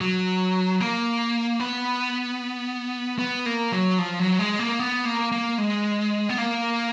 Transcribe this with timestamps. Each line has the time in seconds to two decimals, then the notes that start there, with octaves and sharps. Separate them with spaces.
0.01 F#3
0.80 A#3
1.60 B3
3.19 B3
3.46 A#3
3.72 F#3
3.99 F3
4.19 F#3
4.39 G#3
4.59 A#3
4.79 B3
5.05 A#3
5.32 A#3
5.58 G#3
6.29 B3
6.38 A#3